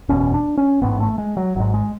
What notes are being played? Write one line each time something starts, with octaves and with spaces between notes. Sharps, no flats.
F#1 E2 B2 C#4
D4
C#4
A1 G#2 B3
A3
G#3
F#3
G#1 G#2 F#3
G#3